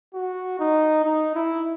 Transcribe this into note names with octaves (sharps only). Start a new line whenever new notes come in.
F#4
D#4
D#4
E4